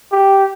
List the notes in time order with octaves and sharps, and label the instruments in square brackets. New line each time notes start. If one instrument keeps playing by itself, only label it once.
[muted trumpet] G4